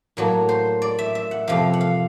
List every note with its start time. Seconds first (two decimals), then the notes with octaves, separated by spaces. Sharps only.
0.17 A2 F#3 A#3
0.49 C5
0.82 D5
0.99 E5
1.15 E5
1.31 F#5
1.48 F2 C3 F3 F5
1.73 F#5
1.81 F5